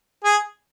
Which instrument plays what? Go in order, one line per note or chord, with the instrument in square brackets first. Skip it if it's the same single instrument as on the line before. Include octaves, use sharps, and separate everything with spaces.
[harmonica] G#4